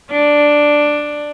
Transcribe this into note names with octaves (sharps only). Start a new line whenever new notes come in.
D4